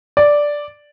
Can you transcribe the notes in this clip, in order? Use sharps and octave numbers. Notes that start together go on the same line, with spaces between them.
D5